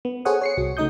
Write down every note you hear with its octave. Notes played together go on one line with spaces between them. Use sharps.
B3
G#4 A4 C5 C#5 F#5 D#6
C#5 C7 C#7
C2 F#4
C#3 A3 D#4 D#5 D#6 G6